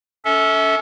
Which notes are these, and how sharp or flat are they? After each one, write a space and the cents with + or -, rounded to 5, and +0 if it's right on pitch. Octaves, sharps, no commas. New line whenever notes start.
C#4 +35 A4 +0 E5 -25